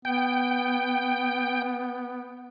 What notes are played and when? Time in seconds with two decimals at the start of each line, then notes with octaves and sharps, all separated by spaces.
0.05 B3 G5